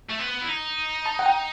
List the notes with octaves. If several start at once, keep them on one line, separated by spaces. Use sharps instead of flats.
A3
B3
E4
D#4
A5
F#5
G5